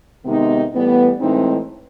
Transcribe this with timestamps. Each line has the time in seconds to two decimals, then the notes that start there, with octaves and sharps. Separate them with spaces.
0.25 C3 D#3 G#3 B3 D#4
0.72 A2 E3 G3 B3
1.20 A2 E3 G#3 C4 D#4